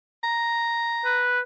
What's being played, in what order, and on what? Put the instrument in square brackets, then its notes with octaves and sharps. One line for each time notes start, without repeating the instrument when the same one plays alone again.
[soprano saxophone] A#5
[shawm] B4